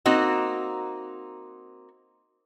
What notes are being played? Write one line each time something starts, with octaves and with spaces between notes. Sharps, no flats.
A#3 C4 D#4 F#4